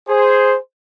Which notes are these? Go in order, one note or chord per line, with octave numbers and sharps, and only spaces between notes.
G#4 C5